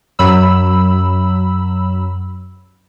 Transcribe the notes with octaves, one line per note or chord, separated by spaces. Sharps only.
F#2 F#3 B5 E6